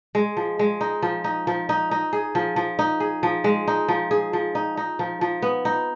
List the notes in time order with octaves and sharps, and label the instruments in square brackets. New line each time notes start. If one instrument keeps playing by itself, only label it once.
[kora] G#3
F3
G#3
D#4
F3
D#4
F3
D#4
D#4
G#4
F3
F3
D#4
G#4
F3
G#3
D#4
F3
G#4
F3
D#4
D#4
F3
F3
B3
D#4